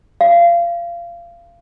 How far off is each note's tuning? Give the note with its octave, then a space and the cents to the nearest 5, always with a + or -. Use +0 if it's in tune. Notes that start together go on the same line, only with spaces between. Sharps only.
F5 -25